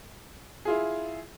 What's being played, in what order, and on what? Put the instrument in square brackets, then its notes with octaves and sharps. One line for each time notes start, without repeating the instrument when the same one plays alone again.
[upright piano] E4 F4 G#4